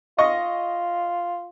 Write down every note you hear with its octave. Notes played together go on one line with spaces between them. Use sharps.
F4 D#5 C#6